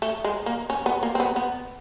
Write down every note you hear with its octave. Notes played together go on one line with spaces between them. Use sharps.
A3
G#3
A#3
C#4
B3
A#3
C4
B3
B3